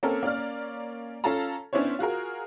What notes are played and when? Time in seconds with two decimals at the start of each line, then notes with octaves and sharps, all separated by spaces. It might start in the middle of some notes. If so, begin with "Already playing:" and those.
0.03 A#3 C4 C#4 A4 A#4
0.23 A#3 C#4 D5 F6
1.24 C#4 F4 A4 F5 A5 A#5
1.73 B3 C#4 D4 E4 C5 C#5
1.99 F4 F#4 G#4 A#4